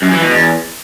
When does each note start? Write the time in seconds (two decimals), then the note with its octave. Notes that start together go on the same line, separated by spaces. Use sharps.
0.02 F#2
0.12 E3
0.22 B2
0.32 E2